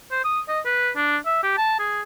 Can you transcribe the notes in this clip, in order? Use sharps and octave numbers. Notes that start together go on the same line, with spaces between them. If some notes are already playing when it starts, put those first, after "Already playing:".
C5
D#6
D#5
B4
D4
E5
G4
A5
G#4